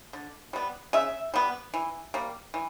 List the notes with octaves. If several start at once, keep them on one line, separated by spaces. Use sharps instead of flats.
D3
G3 B3
C#3 E5
G3 B3
E3
G3 A#3
E3